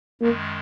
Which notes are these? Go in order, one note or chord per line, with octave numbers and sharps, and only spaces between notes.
F#2 D#3 G#3 A#3